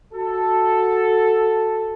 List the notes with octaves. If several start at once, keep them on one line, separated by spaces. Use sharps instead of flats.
F#4 A4